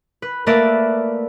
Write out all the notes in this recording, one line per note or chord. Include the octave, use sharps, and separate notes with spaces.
B4
A3 A#3 A#4 B4 D5 E5